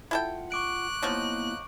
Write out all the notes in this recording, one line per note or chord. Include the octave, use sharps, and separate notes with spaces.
E4 F4 A4 F#5 G5
C#6 D6 F#6 D7
F3 F#3 A#3 B3 D#4 E4